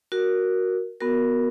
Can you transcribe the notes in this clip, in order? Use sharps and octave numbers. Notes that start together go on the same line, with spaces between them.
F#4 A#4
B3 F#4 A#4